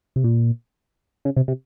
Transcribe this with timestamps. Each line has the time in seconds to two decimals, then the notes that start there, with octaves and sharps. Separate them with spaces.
0.16 C3
0.24 A#2
1.25 C#3
1.36 C3
1.48 C3